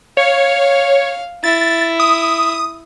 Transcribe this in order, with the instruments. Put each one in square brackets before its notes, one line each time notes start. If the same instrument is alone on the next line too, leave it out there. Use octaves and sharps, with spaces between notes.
[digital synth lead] C#5 [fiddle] F5
[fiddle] E4 [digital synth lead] A6
[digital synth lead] D#6